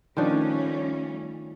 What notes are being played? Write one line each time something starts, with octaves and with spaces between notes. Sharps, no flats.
D#3 F3 G3 A3 C#4 D4